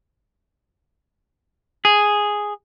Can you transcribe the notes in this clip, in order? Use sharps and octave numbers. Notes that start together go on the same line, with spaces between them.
G#4